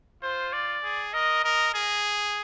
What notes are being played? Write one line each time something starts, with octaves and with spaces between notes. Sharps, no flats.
F4 C5
D5
G#4
A#4 D#5
A#4 D#5
G#4